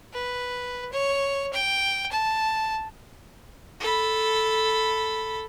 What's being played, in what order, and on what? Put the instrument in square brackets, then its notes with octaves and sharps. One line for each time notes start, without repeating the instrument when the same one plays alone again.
[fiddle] B4
C#5
G5
A5
A4 B5